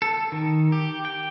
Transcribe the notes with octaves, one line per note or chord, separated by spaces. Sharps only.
A4
D#3
G4
G5